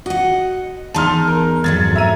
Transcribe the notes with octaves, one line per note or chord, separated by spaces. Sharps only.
F#4 D#5 F#5
E2 D#4 A5 C6 F6
A#4
F2 G#2 F#3 G#6 A6
E5 A#5 D#7